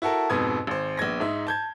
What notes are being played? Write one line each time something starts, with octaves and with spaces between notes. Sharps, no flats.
E4 F#4 A4 A#4 A5
F2 G#2 B2 B4 D#6 G#6
G#1 C5
A#1 B3 G#6 A#6
G#2 D#4 E5
A5 G6 G#6